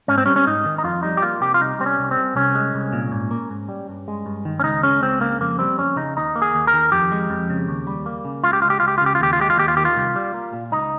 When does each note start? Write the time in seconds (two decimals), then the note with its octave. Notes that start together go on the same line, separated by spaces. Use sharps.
0.08 G#2 C#4
0.18 C4
0.26 G3 C#4
0.36 C#4
0.47 G#2 D#4
0.65 D#3
0.78 D#4
0.84 F2 F4
1.03 G3 D#4
1.17 G4
1.22 A#3 F4
1.41 C3 G4
1.54 F4
1.60 C2 D#4
1.79 G3 C4
1.86 C#4
1.99 C2
2.11 C4
2.17 C3
2.36 C2 C#4
2.55 G#3
2.74 C2
2.93 A#2
3.12 G#2
3.31 A#3
3.50 G#2
3.69 G3
3.89 G2
4.08 G#3
4.26 G2
4.45 D#3
4.60 C#4
4.64 C#2 D#4
4.83 G#3 C#4
5.02 C#2 C4
5.21 C#3 A#3
5.41 F2 A#3
5.59 G3 C4
5.78 F2 C#4
5.96 C#3 D#4
6.16 D#2 D#4
6.36 A#3
6.42 G#4
6.55 D#2
6.67 A#4
6.74 D#3
6.92 F2 G4
7.12 G#3
7.30 F2
7.50 C#3
7.68 D#2
7.87 G3
8.06 A#3
8.25 C#3
8.44 C#2 F4
8.53 G4
8.62 G#3 F4
8.70 G4
8.80 C#2 F4
8.88 G4
8.98 F4
9.01 C#3
9.06 G4
9.15 F4
9.20 D#2 G4
9.33 F4
9.39 G#3 G4
9.50 F4
9.58 D#2 G4
9.68 F4
9.77 D#3 G4
9.85 F4
9.96 C2
10.16 G3
10.34 A#3
10.53 A#2
10.72 C#2 D#4